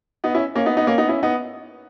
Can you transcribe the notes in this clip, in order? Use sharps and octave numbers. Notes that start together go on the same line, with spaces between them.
B3 D#4
C#4 E4
A#3 C#4
B3 D#4
B3 D#4
A#3 C#4
B3 D#4
C#4 E4
B3 D#4